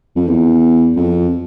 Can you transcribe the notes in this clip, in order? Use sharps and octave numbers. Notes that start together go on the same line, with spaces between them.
F2
E2
F2